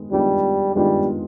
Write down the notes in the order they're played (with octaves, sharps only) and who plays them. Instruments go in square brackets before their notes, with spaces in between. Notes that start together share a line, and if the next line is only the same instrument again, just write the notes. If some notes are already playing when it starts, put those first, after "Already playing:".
Already playing: [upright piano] D#3 G#3 B3
[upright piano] D#3 G#3 B3 D4 F4 [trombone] G3
[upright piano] D#3 G#3 B3 D4 F4 [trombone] G3